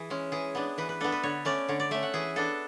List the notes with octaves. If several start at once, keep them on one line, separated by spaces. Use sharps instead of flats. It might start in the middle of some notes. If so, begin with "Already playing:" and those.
Already playing: E3 G#4
G#3 C#4
E3 G#4
B3 D4
E3 B4
B4
B3 D4 A4
B4
D3 C#5
A3 C#4 D5
D3 C#5
D5
A3 C#4 E5
F#5
E3 G#4
B3 D4 A4